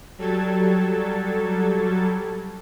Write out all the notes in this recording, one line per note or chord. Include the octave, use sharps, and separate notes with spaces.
F#3 G3 A4 G#6 A6